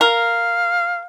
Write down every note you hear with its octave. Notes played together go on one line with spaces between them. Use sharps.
A#4 F5